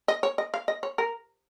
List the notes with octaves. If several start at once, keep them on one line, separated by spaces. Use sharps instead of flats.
D#5
C#5
D#5
F5
D#5
C#5
A#4